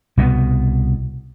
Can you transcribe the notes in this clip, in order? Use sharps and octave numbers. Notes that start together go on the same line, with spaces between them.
C2 B2 G3 B3